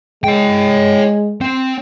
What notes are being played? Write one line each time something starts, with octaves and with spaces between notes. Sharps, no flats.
G#3 C#5 G5
C4